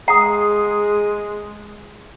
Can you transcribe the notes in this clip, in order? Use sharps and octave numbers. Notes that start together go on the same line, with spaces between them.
G#3 G#4 F#5 A#5 D#6